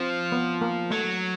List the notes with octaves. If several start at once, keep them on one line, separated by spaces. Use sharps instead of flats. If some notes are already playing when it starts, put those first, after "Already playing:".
Already playing: F3 C4
B3
A#3
F#3 A3